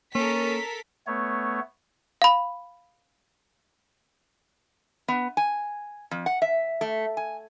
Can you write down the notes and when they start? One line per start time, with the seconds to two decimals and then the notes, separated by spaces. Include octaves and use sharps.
0.15 A#3 C#4 A4 A#4 B6
1.07 A3 B3 C#5
2.22 F5 B5
5.08 B3
5.37 G#5
6.11 F2
6.26 F#5
6.42 E5
6.81 A3
7.17 G#5